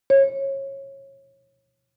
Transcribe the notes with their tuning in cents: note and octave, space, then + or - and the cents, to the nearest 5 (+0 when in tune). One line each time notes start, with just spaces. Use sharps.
C#5 -20